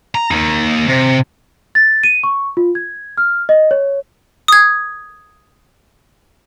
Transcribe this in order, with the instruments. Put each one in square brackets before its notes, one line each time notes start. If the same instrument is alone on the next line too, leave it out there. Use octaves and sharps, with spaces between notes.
[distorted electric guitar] A#5
A#3 D#4
C3
[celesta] A6
D#7
C#6
F4
G#6
F6
D#5
C#5
[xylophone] D#6 G#6